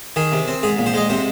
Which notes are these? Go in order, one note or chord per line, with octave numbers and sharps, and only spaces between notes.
D#3 G#4
C3
C4
G#2 G#4
A#1
C5
G#3 D#5
C3 C5